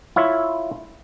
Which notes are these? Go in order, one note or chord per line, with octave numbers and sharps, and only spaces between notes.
E4 F4 C#5 E5